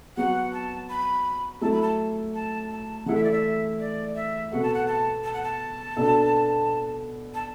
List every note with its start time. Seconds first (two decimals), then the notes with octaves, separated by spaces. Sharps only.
0.17 F#3 B3 F#4 F#5
0.52 A5
0.90 B5
1.61 F#3 A3 E4 A4 A5
1.72 B5
1.82 A5
2.34 A5
2.71 A5
3.06 E3 A3 E4 A4 F#5
3.15 E5
3.24 D5
3.32 E5
3.79 D5
4.15 E5
4.52 B2 B3 F#4 A4 F#5
4.62 A5
4.74 F#5
4.87 A5
5.24 A5
5.34 F#5
5.43 A5
5.97 B2 B3 D4 A4
7.34 A5